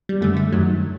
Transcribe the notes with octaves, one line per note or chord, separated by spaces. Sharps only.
G3
F#2 D3 A3
A3
F#2 D#3 F#3